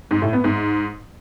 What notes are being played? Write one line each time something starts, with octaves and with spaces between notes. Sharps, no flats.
G#2
A2
B3
G#2